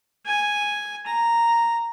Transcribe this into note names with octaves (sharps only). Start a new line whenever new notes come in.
G#5
A#5